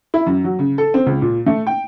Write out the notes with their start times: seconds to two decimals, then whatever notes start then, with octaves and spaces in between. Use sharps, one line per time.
0.14 E4
0.26 F#2
0.44 F#3
0.59 C#3
0.78 A4
0.94 C4
1.06 C#2
1.22 A#2
1.46 A3
1.67 G5